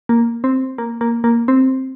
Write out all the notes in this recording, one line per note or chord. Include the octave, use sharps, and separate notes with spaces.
A#3
C4
A#3
A#3
A#3
C4